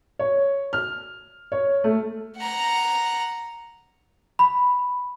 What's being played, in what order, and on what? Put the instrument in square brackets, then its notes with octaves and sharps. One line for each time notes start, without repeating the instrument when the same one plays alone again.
[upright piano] C#5
F6
C#5
A3
[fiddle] F#5 A#5
[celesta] B5